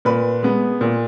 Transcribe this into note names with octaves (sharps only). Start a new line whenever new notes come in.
A#2 B4
G#3 B3
A#2